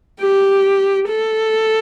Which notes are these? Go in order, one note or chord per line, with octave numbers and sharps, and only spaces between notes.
G4
A4